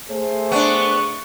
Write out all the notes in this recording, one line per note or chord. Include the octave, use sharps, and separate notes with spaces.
A3 G#4 C5
B3 D4 C#6